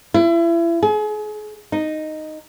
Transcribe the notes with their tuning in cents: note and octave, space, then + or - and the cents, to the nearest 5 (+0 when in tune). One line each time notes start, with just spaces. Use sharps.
E4 +35
G#4 +35
D#4 -5